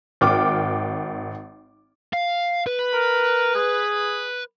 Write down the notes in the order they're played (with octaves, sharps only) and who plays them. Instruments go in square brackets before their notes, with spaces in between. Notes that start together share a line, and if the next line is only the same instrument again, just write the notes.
[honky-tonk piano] G#1 G5 D6 F6
[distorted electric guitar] F5
B4
[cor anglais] A#4
G#4